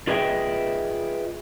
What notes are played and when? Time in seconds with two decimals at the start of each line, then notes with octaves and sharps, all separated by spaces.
0.07 F4 G#4 B4 D#5 E5 G5